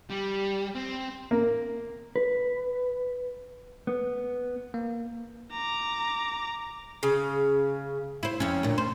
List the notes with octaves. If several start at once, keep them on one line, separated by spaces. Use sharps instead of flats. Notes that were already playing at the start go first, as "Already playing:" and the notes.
G3
C4
A#3
B4
B3
A#3
A#5 D6
C#3
E4 C5
F2 C#4
D2 A#2
C5